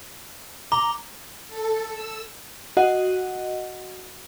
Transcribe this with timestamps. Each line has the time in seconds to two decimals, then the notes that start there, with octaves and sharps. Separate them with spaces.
0.72 A#5 D6
1.48 A4
1.91 E6
2.77 F#4 D#5 F#5